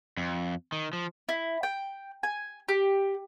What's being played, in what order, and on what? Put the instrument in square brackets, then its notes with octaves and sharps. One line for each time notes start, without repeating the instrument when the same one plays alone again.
[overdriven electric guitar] F2
D#3
F3
[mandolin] E4
G5
G#5
G4